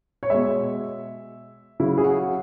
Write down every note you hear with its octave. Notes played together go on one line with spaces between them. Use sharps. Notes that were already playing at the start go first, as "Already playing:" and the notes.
C#5
B2 G#3 E5
C#3 F#3 E4
G#4
F#4